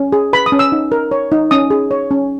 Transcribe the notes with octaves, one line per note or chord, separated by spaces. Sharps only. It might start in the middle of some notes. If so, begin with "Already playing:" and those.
Already playing: C#4
G#4
B4 B5
D#6
C#4
E6
D#4
A#4
C#5
D#4
C#4 D#6
G#4
C#5
C#4